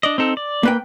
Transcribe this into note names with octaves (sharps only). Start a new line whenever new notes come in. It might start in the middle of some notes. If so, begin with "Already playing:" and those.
D4 D5 D#5
C4 D#4 A4
D5
A#3 B4 G5